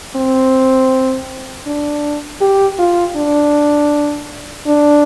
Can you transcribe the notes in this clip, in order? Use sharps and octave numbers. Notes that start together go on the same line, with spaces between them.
C4
D4
G4
F4
D4
D4